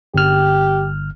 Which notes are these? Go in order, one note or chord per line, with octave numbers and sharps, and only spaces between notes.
G1 G4 F6